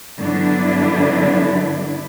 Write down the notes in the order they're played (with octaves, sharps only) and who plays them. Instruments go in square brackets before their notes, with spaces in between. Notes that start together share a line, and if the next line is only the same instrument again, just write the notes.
[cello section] G2 D3 F#3 B3 D4 E4